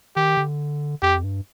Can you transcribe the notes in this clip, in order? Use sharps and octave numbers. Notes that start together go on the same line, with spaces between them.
D#3 G4
D3
F2 G4
G2